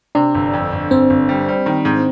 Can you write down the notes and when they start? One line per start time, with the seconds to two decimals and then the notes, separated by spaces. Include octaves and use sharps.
0.15 C3 D4 D5
0.35 G1
0.53 F2
0.73 G1
0.91 G1 C4 C5
1.10 G1
1.29 G3
1.48 G3
1.66 D#3
1.85 G#2